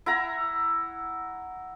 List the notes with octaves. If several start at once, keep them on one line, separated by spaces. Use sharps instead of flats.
E4 F#5 A#5